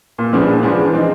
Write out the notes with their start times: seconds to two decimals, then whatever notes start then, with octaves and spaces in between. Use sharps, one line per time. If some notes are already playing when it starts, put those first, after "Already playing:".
0.18 A#2
0.33 F3 G#3 B3 D4
0.48 A#2
0.63 F3 G#3 B3 D4
0.79 E3
0.94 G#3 C4 D#4